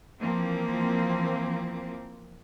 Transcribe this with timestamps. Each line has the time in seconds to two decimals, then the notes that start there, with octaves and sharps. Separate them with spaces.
0.20 E3 F3 A#3 C4